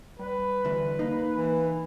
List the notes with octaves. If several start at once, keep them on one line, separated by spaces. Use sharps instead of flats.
G3 B4
D2 E3
A#3 D#4
E3